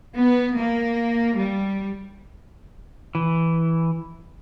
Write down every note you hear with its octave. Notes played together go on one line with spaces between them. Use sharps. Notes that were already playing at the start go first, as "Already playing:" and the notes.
B3
A#3
G3
E3